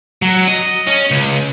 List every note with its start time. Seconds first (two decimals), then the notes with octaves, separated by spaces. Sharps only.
0.22 F#3
0.48 D#5
0.87 C#4
1.11 C#2